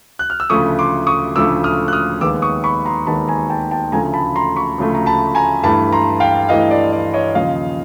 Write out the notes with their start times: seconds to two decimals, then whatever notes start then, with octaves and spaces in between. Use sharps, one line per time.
0.19 F#6
0.30 F6
0.40 E6
0.50 D2 C#3 F3 A3 C#6 D#6
0.79 C6 D6
1.07 C#6 D#6
1.36 D2 C#3 F3 A3 D6 E6
1.64 D#6 F6
1.88 F#6
1.93 D#6 F6
2.21 D#2 D#3 G#3 B3 D6 E6
2.42 C#6 D#6
2.64 B5 C#6
2.86 A#5 C6
3.07 D#2 D#3 G#3 B3 A5 B5
3.28 G#5 A#5
3.50 G5 A5
3.71 G5 A5
3.92 D2 C#3 F3 A3 G#5 A#5
4.14 A5 B5
4.36 A#5 C6
4.56 B5 C#6
4.78 D2 C#3 F3 A3
4.95 A#5
5.06 A5 B5
5.35 G#5 A#5
5.63 G2 E3 A3 A5 B5
5.92 A#5 C6
6.20 F5 G5
6.49 G2 E3 A3 D#5 F5
6.71 D5
6.92 D5
7.14 C#5 D#5
7.34 D#2 C#3 F3 D#5 F5